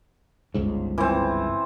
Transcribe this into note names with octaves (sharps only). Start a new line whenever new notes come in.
G1 C#2 G#2
E3 C4